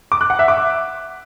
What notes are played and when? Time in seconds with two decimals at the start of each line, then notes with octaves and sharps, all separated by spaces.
0.12 D6
0.21 F#6
0.30 F#5
0.39 E5
0.48 D6